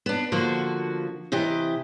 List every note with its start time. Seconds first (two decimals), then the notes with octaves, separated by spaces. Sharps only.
0.06 B3 D4
0.32 D3 F3 A#3 F#4
1.32 C3 E3 G4 D#5